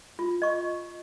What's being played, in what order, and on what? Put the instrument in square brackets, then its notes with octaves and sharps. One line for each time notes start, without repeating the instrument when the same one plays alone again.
[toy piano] F4
D#5 C#6